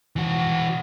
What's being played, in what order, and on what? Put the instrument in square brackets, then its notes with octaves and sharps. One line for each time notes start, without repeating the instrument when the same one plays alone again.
[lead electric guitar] E3 F#4